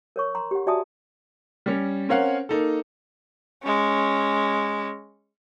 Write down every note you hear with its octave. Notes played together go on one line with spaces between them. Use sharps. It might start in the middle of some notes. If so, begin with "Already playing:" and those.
A#4 C#5 C#6
A#5 C6
G4 F#5
F#4 D5 E5 G#5 A5 D#6
G3 C#4
C4 C#4 A#4 C#5 F5 F#5
A#3 D#4 A4
G#3 C#4